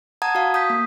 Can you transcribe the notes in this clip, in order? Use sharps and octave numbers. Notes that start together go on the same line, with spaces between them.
F#5 A5 A#5 D#6 G#6
F#4 F5
D#6 G6 B6
A#3